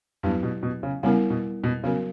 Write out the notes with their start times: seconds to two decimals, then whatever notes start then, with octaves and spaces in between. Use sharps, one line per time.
0.23 G2 F#3 B3 E4 G4 B4
0.43 B2
0.63 B2
0.83 C#3
1.03 C#3 G3 B3 E4 A#4
1.30 B2
1.64 B2
1.84 C#3 F#3 B3 F#4 A#4